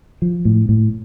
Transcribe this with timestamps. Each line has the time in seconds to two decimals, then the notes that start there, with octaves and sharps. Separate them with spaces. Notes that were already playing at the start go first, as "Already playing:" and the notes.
0.22 F3
0.45 A2
0.69 A2